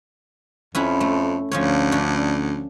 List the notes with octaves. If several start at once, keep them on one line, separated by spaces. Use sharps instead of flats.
F2 C#4 E4 F#5
A3
D2 F3 C#4 C#5
C#4 D4 C#5